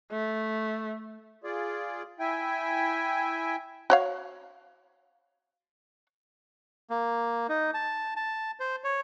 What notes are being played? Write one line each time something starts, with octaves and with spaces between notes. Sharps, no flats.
A3
F4 G#4 D5
E4 E5 G5 G#5
F#4 C#5 F5
A#3
D#4
A5
A5
C5
C#5